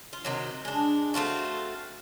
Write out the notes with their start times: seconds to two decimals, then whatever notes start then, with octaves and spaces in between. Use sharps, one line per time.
0.13 F4
0.25 C3 D#3 F#3
0.65 G#3 D4
1.14 A3 C4 F4 F#4